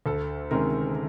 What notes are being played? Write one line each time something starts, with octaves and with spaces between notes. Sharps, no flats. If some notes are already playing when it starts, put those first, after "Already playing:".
D2 A4
C3 D#3 G#3 C#4 A#4